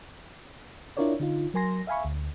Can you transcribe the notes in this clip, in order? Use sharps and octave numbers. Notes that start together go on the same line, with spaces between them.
D4 E4 F4 A#4 C#5 D5
D3 D#4 F4
F#3 A#4 G#5 C6 A#6
E5 F5 G#5 B5 C#6
D2